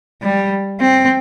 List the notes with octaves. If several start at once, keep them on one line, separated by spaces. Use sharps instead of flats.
G3
C4